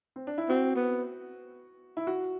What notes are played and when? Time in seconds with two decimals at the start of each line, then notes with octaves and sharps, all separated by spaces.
0.16 C4
0.27 D4
0.38 E4
0.49 C4 F#4
0.76 B3
1.97 E4
2.07 F#4